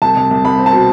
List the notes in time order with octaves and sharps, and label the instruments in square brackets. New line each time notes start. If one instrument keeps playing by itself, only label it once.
[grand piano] C2 A5
C2
C2
C2 B5
C4
A5
B2